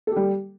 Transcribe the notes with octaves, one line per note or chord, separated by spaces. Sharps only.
G3 G4 A4